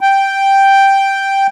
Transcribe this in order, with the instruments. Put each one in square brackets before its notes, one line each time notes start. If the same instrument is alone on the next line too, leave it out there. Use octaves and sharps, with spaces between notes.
[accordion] G5